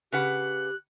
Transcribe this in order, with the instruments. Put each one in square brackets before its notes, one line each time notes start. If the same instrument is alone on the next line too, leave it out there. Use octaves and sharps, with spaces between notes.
[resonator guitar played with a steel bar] C#3 B4 F#5 [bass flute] G4 [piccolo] F#6